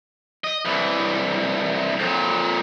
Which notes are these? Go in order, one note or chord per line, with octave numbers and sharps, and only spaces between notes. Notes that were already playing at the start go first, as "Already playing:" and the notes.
D#5
C2 E3
F2 A#2